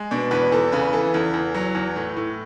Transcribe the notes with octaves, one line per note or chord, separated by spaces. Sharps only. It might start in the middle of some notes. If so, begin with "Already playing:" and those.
Already playing: G#3
B2 D4
E2 B4
E2 A4
C#3 B4
E3 A4
E2
E2
F#3
E2
A2
A2